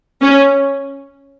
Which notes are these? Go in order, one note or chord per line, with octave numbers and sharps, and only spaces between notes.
C#4